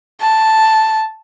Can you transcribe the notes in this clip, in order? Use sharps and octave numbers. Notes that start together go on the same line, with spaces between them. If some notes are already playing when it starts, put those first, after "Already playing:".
A5